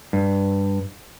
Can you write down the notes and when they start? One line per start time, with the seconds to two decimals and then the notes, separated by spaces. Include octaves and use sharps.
0.13 G2